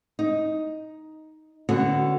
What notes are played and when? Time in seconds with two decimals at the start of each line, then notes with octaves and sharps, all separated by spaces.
0.19 D#4
1.69 D3 B3 C#4 F#4